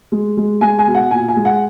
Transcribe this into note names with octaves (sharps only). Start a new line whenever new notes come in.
G#3
G#3
G#3 G#5
G#5
B2
F#5
A#2 G#5
G#5
G#3
F#5